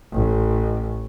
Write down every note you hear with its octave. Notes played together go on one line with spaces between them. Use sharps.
A1